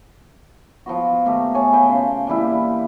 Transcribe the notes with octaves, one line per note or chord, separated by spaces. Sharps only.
F3 B3 F#4
B2 D#3 A3 G4
G#4 C#5 G#5 A5
B4 F5 G5
C#3 C6
A#2 E3 G3 E4